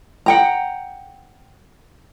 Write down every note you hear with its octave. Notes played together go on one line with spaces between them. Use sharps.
F#5 G5 A#5